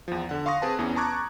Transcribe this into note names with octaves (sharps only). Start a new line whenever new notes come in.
E2 F3
D3 F#5
F5 C6 C#6 D#6 A#6
C4 G#4 B4 A5
E2 E3 B3 C#4
A5 A#5 C#6 D6 F#6 G#6